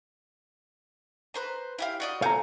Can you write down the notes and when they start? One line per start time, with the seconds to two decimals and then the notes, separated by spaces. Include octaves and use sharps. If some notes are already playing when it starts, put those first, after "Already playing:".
1.34 B4 C5 A#5
1.79 E4 G4 F5
2.00 F#4 D5 D#5
2.22 A4 F5 G#5 A#5 G6